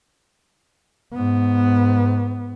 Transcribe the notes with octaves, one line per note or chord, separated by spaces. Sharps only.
G#2 B3